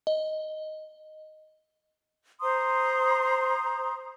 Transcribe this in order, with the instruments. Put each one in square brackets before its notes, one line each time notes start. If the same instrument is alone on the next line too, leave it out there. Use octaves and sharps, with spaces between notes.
[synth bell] D#5
[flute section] C5 A#5 C6 D#6